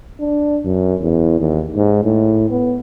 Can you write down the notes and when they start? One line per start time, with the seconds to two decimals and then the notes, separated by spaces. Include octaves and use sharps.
0.20 D4
0.65 F#2
1.01 E2
1.40 D#2
1.75 G#2
2.04 A2
2.50 B3